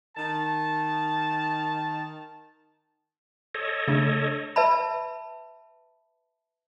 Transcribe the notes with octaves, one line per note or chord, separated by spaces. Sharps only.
D#3 A5
A4 C#5 D#5
C#3 A3 D4
B4 E5 A5 B5